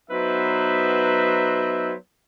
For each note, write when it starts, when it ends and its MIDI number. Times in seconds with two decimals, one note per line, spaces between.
0.10 1.94 54
0.10 1.94 59
0.10 1.94 63
0.10 1.94 71
0.10 1.94 72
0.10 1.94 76